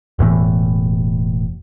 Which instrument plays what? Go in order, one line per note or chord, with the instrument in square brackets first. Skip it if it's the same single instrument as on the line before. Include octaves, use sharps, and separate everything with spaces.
[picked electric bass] E1 E2 A2 E3